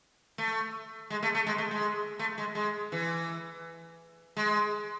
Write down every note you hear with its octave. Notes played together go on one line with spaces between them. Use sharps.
A3
G#3
A3
A3
G#3
A3
G#3
A3
G#3
G#3
E3
G#3